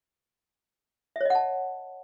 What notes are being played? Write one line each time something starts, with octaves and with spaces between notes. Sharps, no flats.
C#5 D#5 E5 F#5 A5